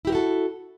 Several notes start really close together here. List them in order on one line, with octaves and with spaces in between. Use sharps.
E4 G4 A#4 F#4 A4